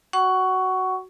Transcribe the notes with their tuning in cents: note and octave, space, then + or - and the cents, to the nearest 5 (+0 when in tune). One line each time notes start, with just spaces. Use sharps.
F#4 +5 F#5 +20 C#6 +10